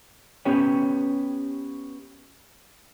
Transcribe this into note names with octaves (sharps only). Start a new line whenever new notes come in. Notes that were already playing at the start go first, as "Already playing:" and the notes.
B3 C#4 G4 B4 C#5 G5